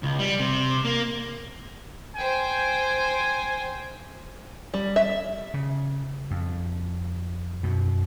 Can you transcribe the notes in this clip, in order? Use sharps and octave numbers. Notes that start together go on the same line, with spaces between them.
C#2
G3
C3
A#3
C5 G5 G#5
G3
E5
C#3
F2
F#2 B2